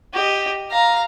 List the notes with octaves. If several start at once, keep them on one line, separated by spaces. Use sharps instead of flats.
G4 D#5
F5 A#5